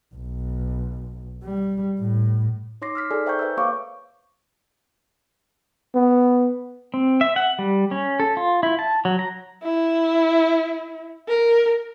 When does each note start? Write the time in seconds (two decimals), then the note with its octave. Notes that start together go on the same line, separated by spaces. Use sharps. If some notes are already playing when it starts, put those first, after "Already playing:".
0.15 B1
1.44 G3
2.00 A2
2.82 D#4 C#5 C6 D6 A#6 C7
2.95 E6 F6 B6
3.11 D#4 G#4 A4 D5 G#5
3.26 C5 E5 G5 A#5 C#6 G6
3.39 B4 E5 G5 E6
3.57 A#3 G4 C#5 F5 C#6 D6
5.95 B3
6.94 C4
7.21 E5
7.36 F#5
7.59 G3
7.91 C#4
8.20 A4
8.37 F4
8.63 E4
8.79 A5
9.05 F#3
9.19 A#5
9.63 E4
11.28 A#4